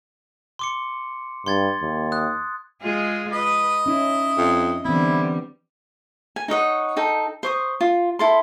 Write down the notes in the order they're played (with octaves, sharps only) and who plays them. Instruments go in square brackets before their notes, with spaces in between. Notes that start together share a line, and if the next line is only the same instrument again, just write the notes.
[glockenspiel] C6 D6 C#7
[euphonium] G2 [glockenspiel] C6 G#6 A6
[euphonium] D#2
[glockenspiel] D#6 F#6
[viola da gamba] G#3 F4 G#4
[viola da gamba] B4 [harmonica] D#5
[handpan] C#4 D#4 [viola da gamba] E4
[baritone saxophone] F2
[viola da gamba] D3 G3 [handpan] E3 B3 C4 [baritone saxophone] E4
[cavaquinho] G#5
D#4 C#5 D#5 F#5
D#4 A4 G5
C5 C#6 D#6
F4
E4 A4 C6